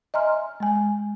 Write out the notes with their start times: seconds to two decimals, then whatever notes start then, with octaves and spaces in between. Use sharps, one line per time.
0.14 D#5 E5 G#5 A#5 C6 F6
0.60 G#3 G#5